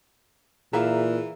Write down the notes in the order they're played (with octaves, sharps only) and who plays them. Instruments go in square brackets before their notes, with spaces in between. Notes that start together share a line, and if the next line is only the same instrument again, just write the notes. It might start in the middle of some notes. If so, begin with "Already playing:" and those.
[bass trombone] A#2 [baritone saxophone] E3 [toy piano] G#4 A#5 [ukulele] E5 F5